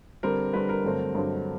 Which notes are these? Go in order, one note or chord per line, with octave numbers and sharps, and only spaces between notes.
D3 G3 C4 A#4
D3 G3 C4 B4
A#4
G2 D3 F#3 A3 C4
G2 D3 F#3 A3 C4